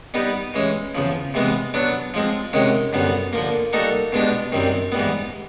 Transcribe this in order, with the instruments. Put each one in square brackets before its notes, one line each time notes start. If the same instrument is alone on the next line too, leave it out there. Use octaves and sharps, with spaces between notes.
[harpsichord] G3 B3 D#4 G4 B4
E3 G#3 C#4
E2 C#3 F3
C3 E3 G#3 B3
F#3 B3 D4 F#4
F3 G#3 C4
C3 D#3 G#3 C#4 F#4
F#2 D3 G3 B3
D3 F3 A#3
G3 A#3 D#4 F#4 A4
B2 G#3 B3 D4 G4
F#2 D#3 G3 C4
G#2 E3 G3 B3